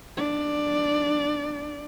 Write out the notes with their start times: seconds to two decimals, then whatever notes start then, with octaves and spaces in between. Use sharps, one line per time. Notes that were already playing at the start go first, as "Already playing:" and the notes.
0.17 D4 D5